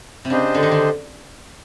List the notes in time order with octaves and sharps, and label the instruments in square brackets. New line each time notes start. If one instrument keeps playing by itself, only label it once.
[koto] C3
[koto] C#3 [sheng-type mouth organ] D4 G4 C5 D#5
[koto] D3
D#3
D3